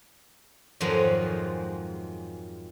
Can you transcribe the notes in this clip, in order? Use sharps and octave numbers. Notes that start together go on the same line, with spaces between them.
F2 G#2 D#3 F3 F#3 G#3